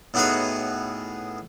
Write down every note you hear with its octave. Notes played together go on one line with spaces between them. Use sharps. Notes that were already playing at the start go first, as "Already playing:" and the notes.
A2 B3 D#4 F#4 G#4 C#5